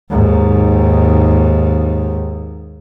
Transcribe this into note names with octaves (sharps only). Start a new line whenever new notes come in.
D#2 G#2